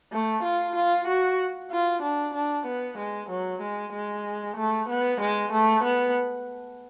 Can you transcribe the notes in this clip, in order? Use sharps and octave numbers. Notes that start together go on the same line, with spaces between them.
A3
F4
F4
F#4
F4
D4
D4
B3
G#3
F#3
G#3
G#3
A3
B3
G#3
A3
B3